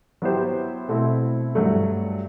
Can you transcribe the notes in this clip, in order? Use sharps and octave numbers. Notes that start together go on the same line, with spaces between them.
F#3 B3 E4 G4 C5
B2 A3 C4 E4
G2 F#3 A3